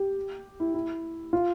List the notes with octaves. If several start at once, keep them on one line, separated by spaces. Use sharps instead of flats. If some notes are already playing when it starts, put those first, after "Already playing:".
Already playing: G4
E4
E4
F4